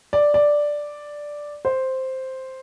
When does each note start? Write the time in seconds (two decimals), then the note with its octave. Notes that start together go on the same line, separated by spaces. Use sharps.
0.13 D5
0.34 D5
1.65 C5